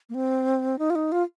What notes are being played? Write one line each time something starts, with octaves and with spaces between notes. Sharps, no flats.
A#3
C4
D#4
F4
D#4
F4